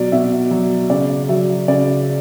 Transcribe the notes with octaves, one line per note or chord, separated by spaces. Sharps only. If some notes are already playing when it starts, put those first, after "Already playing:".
Already playing: B2 F#3 D5
B2 E5
F#3
C#3 D5
F#3 E5
C#3 D5